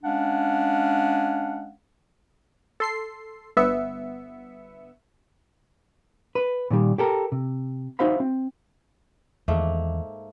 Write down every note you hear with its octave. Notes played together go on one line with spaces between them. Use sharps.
G#3 C#4 D4 F5 F#5
A4 C6 C7
G1 B3 E5 C#7
B4
A#2 D#3 G3
G4 A4 A#4
C3
D#4 F#4 C5 E5 F5 B5
C4
E2 G#2 D#3 A3 A#3